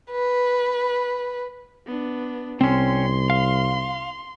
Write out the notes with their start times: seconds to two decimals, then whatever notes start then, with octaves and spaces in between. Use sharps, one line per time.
0.12 B4
1.87 B3 D4
2.61 C2 C4 C#4 C6
3.30 F5